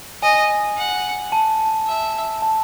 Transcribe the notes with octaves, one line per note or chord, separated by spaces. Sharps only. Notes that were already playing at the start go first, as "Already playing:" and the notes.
D#5 G#5
F#5
A5
E5
A5